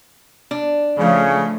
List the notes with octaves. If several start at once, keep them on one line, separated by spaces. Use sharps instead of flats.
D4
C#3 F3 A3